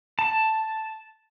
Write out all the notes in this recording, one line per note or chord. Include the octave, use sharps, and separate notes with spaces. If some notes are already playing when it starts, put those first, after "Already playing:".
A5